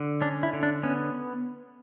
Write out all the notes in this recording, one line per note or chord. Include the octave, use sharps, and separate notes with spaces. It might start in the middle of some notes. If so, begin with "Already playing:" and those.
Already playing: D3
C#4 D4
E4
D3
D4
B3 C#4